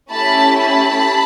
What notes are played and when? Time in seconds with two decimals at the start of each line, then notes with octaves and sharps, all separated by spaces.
0.12 A3 C#4 E4 G4 A5 B5
0.60 A5 B5